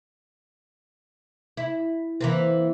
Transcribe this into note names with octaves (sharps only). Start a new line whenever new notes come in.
E4
E3 A#3 C4